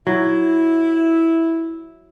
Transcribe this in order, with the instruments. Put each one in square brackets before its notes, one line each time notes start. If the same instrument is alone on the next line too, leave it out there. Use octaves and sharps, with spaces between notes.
[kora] F#3 [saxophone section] E4